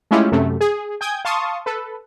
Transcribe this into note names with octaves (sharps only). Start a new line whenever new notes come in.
G#3 A3 C#4 E4 F4 G4
F#2 C3 A3
G#4
G5 G#5 D#6 G6 G#6
F5 A5 C6 C#6 D#6
A4 B4